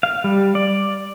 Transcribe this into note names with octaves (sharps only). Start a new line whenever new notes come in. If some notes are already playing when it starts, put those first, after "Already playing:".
F5
G3
D5